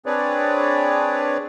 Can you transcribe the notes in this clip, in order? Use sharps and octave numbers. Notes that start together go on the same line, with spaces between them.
C4 D4 G#4 B4 C#5 D5